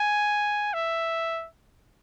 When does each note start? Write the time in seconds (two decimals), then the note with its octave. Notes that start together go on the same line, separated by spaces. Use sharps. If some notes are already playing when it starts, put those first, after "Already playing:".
Already playing: G#5
0.73 E5